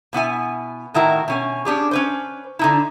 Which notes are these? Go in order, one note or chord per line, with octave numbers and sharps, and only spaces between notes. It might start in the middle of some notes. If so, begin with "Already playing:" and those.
B2 B3 E4 G#5
A2 D#3 E4 F#4 A#4
B2 C#4 G#5
C#4 D4 G4 G#4
C#4 B4 C5
D3 D#4 E4